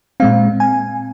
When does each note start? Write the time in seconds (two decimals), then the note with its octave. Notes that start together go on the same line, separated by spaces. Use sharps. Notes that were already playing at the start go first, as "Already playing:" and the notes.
0.20 A#2 G#3 C4 F5
0.60 G#5